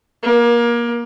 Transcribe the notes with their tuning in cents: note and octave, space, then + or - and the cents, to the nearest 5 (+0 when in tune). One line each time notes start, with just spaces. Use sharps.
A#3 +25